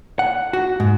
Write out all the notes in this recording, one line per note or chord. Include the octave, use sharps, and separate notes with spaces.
F#5
F#4
G#2